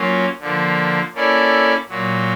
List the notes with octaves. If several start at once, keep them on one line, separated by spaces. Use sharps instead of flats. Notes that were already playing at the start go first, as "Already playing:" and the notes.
Already playing: F#3 A#3 C#4 F4
D3 F3 A#3
A#3 C#4 E4 A4 D5
A#2 F#3 A#3